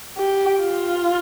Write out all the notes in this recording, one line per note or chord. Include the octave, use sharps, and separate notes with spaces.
G4
F4